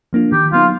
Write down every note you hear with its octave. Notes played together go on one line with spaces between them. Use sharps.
F3 A#3 D4 F4
D#3 G4
F#3 B3 D#4 F4